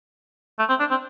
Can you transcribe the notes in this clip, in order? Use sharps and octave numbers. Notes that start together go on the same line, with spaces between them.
A3
C4
D4
C4